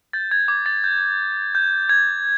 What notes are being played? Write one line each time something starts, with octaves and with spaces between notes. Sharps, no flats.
G6 A6
G#6
D6 G#6
A6
G6
G6
G6
G6 G#6